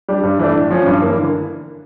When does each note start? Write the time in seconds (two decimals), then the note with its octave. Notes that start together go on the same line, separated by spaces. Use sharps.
0.09 G3 D4
0.23 G2
0.39 E3 A3 D4
0.55 A2
0.70 F3 C#4
0.86 G2
1.02 E3 A#3
1.17 D3